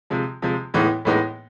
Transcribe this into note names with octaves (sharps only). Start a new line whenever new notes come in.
C3 F3 G#3
C3 F3 G#3
A2 E3 G#3 B3 D#4
A2 E3 G#3 B3 D#4